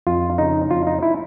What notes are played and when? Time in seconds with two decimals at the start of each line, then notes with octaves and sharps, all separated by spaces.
0.07 F2 F4
0.38 C#3 D#4
0.71 F2 F4
0.87 D#4
1.03 E4